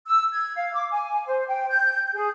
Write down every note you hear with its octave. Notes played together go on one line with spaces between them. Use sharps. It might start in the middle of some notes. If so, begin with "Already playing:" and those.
E6
G#6
F5
D6
G#5
C5
G5
G6
G#4